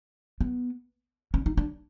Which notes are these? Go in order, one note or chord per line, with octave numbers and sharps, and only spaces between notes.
B3
C#4
D#4
D4